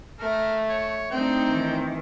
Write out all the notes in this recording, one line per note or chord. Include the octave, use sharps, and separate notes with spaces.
A3 A#4
C#5
A3 C4 D4 D#4 G5
D#3 E3